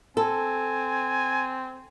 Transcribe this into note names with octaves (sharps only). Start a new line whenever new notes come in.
C4 A4 G#5